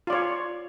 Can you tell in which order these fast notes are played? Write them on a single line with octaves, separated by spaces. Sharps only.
F4 D5 C#5